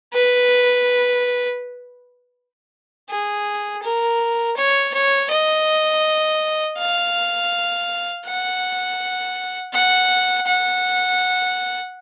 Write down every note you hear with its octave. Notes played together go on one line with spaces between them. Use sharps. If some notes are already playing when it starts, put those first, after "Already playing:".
B4
G#4
A#4
C#5
C#5
D#5
F5
F#5
F#5
F#5